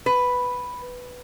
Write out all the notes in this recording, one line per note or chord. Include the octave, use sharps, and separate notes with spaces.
B4